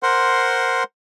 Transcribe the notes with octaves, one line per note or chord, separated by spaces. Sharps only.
A#4 C5 F#5 C6